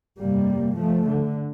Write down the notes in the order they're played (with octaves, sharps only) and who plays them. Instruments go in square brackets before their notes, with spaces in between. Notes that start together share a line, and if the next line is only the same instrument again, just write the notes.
[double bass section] G1 F2 C3 G3 A#3
F3 A3
D3